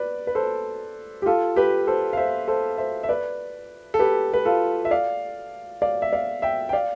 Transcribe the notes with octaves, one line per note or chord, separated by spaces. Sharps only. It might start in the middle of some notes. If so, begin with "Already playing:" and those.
Already playing: B4 D5
B4
A4 C5
G4
F4 A4
G4 B4
A4 C5
F5
C5 E5
A4 C5
C5 E5
E5
B4 D5
A4
G4 B4
B4
F4 A4
E5
D5 F5
D5 F5
E5
D5 F5
E5 G5
G5
D5 F5